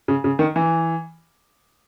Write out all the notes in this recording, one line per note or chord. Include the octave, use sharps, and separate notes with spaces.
C#3
C#3
D#3
E3